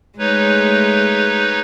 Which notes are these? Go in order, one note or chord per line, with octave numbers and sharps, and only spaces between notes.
G#3 A3 D#4 B4 C#5